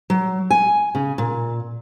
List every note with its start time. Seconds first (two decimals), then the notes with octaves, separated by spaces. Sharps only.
0.10 F#3
0.50 G#5
0.95 C#3
1.18 A#2